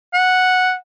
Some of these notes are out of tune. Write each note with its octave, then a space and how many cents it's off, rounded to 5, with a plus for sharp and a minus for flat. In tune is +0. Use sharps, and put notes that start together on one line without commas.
F#5 -5